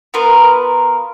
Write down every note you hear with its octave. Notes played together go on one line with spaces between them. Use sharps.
B3 F4 A#4 B4